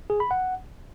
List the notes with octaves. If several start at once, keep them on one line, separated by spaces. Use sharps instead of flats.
G#4
B5
F#5